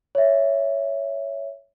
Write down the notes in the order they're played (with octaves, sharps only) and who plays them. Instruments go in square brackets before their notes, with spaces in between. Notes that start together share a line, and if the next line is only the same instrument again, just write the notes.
[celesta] C#5 E5